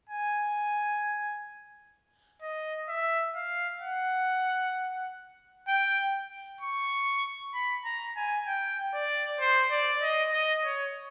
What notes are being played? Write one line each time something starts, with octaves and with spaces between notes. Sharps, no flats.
G#5
D#5
E5
F5
F#5
G5
C#6
B5
A#5
G#5
G5
D5
C5
D5
D#5
D#5
C#5